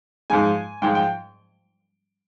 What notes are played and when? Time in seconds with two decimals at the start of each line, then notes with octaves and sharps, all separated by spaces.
0.30 G#2 F3 G#3 G#5
0.82 G#2 F3 G#3 G5
0.95 G5